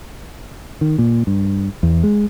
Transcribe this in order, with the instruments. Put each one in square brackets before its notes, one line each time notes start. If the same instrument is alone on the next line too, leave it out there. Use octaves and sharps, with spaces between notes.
[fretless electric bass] D#3
A#2
G2
E2
G#3